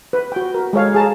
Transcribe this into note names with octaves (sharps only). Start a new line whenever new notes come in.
B4
F#4 G5
A#4
G#3 A4 C#5 F5
G#4 A5 A#5